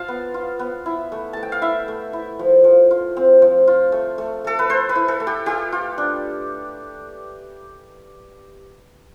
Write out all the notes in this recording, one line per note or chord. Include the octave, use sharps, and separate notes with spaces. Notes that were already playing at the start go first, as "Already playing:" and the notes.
Already playing: F4 F5 A5
B3
F4
B3
E4
A3
A3 A5
G5
F5
E4 E5
A3
E4
F3
F3
F4
C4
F3
F4
A3
A3
A3 A4
B4
A3 C5
B4
E4
A4
A3
G4
F4 G4
F4
D4